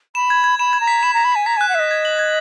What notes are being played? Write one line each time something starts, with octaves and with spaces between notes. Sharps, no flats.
B5 E7
G#6
G#6
B5 E7
G#6
A#5
B6
B5 E7
A#5 B6
B5
G#5 B6
A#5 B6
G#5 F#6
F#5
D#5 E5 F#6
G#6
F#7
G#6